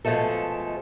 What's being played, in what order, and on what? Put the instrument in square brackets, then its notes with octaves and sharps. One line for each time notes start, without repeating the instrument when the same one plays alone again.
[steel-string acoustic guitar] B2 F3 G#3 A3 A4